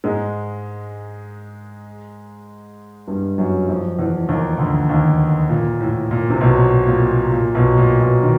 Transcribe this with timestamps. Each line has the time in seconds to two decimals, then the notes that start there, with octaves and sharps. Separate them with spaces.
0.04 G#2 G#3
3.08 G2 G3
3.38 F#2 F#3
3.68 F2 F3
3.99 E2 E3
4.29 D#2 D#3
4.59 D2 D3
4.89 D#2 D#3
5.49 A#2
5.81 A2
6.11 A#2
6.30 C3
6.41 B1 B2
6.87 A#2
7.32 A#2
7.55 B1 B2
7.78 A#2
8.00 B1 B2
8.23 D#3